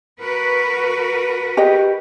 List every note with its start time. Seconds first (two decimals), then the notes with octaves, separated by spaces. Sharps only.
0.20 F#4 A#4 B4
1.57 G4 G#4 D#5